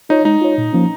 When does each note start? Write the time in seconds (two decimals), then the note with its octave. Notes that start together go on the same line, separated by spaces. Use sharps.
0.09 D#4 F4 C#5
0.25 G#3 D#4
0.41 F4 C#5
0.58 A#2
0.73 F3 A#3 C#4